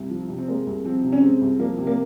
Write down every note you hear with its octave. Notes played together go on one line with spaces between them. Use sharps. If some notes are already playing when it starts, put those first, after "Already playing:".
Already playing: C2
F3
C3
C4
G#3 A#3
C2
F3 C4
C3
C#4
G#3 C4
C2
F3 A#3
C3
A#3